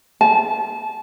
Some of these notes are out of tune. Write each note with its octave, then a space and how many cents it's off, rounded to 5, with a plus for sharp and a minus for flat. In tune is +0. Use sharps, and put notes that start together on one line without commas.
A5 -30